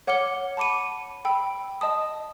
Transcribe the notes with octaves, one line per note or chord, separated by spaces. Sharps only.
C#5 F#5 D6 F6 C#7 G7
A5 B5 D6 C#7 D#7
G5 B5 E6
D#5 A5 D#6